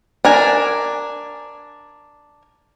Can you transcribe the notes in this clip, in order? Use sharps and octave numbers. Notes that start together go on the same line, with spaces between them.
D4 A#4 G#5